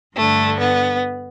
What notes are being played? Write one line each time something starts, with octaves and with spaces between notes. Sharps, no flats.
G2 D3 A3
B3